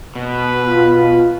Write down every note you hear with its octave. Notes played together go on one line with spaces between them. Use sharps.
B2 B4
F4